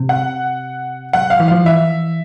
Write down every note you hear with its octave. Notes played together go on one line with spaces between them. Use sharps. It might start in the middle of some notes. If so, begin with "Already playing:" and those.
Already playing: C3
F#5
F#3 F#5
F5
E3
F3 F5
E3 E5